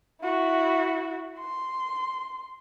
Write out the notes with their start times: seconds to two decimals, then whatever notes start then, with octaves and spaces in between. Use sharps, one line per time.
0.21 E4 F#4
1.39 C6